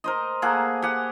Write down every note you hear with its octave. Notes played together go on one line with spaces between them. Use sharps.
A#4 C5 D#5
A#3 G#4 A4 F#5
G4 G#4 F#5